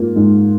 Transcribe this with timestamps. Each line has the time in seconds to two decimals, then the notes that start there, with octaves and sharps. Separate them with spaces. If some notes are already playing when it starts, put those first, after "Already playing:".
Already playing: G#2 A#3 F4
0.16 G#2